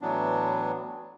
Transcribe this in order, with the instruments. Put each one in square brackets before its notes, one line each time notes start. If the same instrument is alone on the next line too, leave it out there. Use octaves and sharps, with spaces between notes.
[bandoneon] A2 E3 F#3 B3 D4